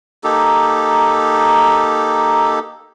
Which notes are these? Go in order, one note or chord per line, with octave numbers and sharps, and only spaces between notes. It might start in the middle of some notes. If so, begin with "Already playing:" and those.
A#3 D#4 G4 A4